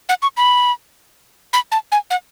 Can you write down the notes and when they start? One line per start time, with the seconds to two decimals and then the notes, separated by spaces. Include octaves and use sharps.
0.09 F#5
0.22 C#6
0.37 B5
1.53 B5
1.72 A5
1.92 G#5
2.10 F#5